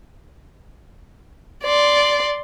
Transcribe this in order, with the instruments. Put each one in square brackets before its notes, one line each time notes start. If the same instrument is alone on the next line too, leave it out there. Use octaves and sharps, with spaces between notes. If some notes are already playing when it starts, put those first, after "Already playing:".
[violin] D5 C6